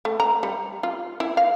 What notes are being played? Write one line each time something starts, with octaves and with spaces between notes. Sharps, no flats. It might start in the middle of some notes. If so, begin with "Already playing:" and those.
A3
A#5
G3
F4
E4
F5